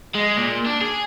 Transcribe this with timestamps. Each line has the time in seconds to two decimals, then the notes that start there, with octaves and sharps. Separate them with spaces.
0.15 G#3
0.37 A#2
0.66 D4
0.81 G#4